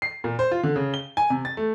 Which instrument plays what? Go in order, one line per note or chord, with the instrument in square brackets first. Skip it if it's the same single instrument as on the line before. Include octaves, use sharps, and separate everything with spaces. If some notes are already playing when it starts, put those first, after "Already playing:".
[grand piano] C7
A#2
C5
F4
D3
C#3
G7
G#5
C3
A6
A3